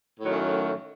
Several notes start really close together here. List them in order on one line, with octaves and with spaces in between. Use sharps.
A2 F#3 D#3 A3 F#2